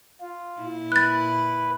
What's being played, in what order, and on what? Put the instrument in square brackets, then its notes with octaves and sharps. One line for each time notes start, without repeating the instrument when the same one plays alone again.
[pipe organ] F4
[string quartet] A#2 E4
[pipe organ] B4 [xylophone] F#6 A6